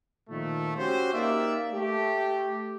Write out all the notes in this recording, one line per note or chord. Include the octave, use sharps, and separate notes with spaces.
A#2 D#3 F3 A3
C#4 F#4 G4 C5
A#3 D#4 G4 D5 E5
A3 G4